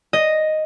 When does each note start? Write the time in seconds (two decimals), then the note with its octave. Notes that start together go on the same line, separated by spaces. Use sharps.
0.13 D#5